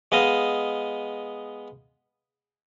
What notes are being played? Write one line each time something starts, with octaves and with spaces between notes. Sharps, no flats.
G#3 B3 D#5 F5